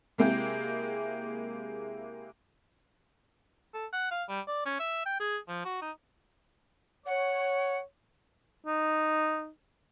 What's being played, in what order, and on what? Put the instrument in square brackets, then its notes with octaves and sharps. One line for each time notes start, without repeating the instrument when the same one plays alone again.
[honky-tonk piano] C3 G#3 A#3 E4 G4 G#4
[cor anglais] A4
F#5
F5
G3
D5
C#4
E5
G5
G#4
F3
F#4
D#4
[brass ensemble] C#5 [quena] F#5
[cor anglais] D#4